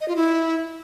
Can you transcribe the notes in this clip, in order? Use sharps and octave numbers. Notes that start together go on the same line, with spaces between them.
D#5
F4
E4